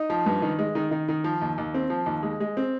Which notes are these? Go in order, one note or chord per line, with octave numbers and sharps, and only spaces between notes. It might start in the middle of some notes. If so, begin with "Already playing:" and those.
Already playing: D#4
F3
G2
D#3
G#3
D#3
D#3
D#3
F3
D#2
D#2
C4
F3
D#2
G#3
G#3
C4